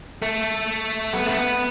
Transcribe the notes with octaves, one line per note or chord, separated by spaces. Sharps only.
A3
B3
A3
B3